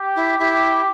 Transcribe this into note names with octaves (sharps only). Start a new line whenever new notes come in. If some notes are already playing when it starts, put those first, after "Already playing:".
Already playing: G4
E4
E4 G4